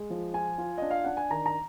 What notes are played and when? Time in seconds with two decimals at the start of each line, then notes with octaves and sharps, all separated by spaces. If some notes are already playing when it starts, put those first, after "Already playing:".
Already playing: G#3
0.10 F3
0.34 F4 G#5
0.58 F4
0.78 D4 D#5
0.91 F5
1.04 D4 F#5
1.17 G#5
1.31 D#3 A#5
1.46 A#5